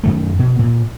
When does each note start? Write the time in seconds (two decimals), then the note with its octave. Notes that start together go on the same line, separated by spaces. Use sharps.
0.04 F#2 D#3 A3
0.39 B2
0.59 A#2